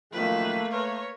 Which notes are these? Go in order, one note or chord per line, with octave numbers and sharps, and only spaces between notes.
F#2 D#3 F3 A3 A#3 B4
A#4 B4 C#5